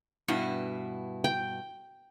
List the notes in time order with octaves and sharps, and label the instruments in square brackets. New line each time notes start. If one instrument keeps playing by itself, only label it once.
[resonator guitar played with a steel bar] G2 B2 E4
[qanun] G5